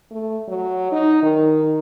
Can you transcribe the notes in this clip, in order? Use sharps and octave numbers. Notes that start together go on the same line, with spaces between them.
A3
F#3
D#4
D#3